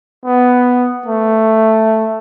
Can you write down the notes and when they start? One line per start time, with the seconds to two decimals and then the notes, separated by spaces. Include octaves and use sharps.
0.25 B3
1.06 A3